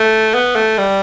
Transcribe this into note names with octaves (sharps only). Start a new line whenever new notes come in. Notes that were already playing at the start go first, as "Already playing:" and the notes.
Already playing: A3
B3
A3
G3